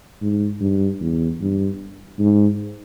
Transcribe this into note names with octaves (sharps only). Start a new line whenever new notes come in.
G#2
G2
E2
G2
G#2